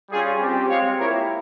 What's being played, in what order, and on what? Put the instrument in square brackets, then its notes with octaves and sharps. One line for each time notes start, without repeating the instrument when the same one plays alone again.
[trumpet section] G3 C#4 F4 G#4
G3 C4 G4
G#3 C4 F4 C#5 F5
A#3 E4 G4 A#4 C#5